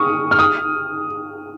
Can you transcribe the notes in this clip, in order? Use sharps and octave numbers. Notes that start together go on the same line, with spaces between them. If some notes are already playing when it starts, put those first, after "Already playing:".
Already playing: C#6 D#6 F6
F6
D#6